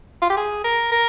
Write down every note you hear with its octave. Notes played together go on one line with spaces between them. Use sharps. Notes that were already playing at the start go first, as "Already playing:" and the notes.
F4
G4
G#4
A#4
A#4